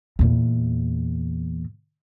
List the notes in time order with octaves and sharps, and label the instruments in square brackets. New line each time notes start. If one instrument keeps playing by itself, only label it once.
[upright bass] E2 A#2